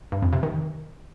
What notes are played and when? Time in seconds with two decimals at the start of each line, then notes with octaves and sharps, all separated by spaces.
0.12 G2
0.22 F2
0.33 C3
0.43 D#3